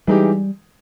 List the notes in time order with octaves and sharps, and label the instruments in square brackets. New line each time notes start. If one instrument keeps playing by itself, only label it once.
[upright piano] E3 G#3 D#4 G4 [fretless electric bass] G3